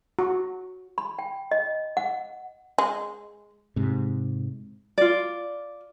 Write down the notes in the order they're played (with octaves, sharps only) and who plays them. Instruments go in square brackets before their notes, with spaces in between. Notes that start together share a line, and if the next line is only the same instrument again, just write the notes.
[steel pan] F#4
[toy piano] B5
G5
D#5
F#5
[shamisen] G#3
[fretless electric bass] G#2 C3
[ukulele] F4 D5